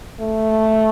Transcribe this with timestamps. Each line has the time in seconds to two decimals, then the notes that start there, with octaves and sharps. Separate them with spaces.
0.20 A3